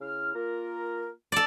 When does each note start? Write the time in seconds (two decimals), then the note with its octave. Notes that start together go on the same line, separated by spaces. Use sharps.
0.01 C#3 E4 F6
0.35 A#3 F4 A#4
1.32 A4 D5